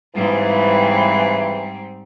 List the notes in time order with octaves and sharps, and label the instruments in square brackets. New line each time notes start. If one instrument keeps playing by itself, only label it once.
[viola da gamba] G#2 G3 C4 [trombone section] C#3 E3